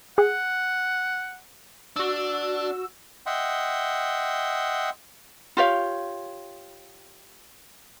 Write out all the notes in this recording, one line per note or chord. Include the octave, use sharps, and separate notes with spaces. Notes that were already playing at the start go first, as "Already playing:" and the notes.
G#4 F#5
D4 F#4 E6
D#5 E5 F#5 G5 C6
F4 G4 C#5 F5